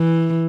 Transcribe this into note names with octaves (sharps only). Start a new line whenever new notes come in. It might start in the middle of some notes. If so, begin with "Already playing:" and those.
Already playing: E3